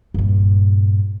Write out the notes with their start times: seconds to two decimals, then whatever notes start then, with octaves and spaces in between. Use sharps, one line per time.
0.14 G2 A#2